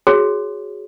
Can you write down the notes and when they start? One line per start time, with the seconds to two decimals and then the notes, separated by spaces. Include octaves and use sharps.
0.07 F#4 G#4 C#5